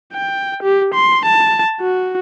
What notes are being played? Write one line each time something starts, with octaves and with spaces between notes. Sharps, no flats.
G5
G4
C6
A5
F#4